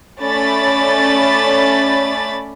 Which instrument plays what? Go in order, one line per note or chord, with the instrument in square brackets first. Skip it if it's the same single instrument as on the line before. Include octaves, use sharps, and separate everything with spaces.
[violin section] A3 C#4 D5 B5 A6